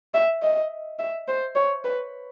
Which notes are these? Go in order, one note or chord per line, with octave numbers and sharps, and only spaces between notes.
E5
D#5
E5
C5
C#5
B4